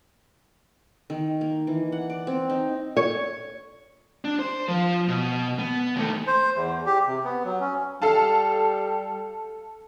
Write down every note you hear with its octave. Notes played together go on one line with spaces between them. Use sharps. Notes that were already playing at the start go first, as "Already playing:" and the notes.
D#3
A#3
E3
F#5
D5
C4
D#4
C#5
D4
C5
F3
B2
B3
D#2 A3
C5
E2
G4
C3
B3
F#3
C#4
G3 A4 F5 A5